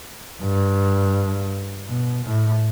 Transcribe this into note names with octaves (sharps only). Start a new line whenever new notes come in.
G2
B2
A2